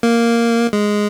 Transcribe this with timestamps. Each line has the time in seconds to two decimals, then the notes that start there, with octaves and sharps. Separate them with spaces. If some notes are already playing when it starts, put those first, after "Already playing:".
0.03 A#3
0.73 G#3